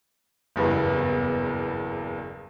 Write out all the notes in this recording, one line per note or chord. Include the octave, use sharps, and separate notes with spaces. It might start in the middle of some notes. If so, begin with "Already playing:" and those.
F#1 E2 G2 B3